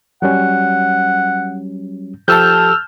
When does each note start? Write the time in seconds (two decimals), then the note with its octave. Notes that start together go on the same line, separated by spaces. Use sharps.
0.22 F#3 G3 C#4 F#5
2.28 F3 G4 A4 A5 E6 F6 G6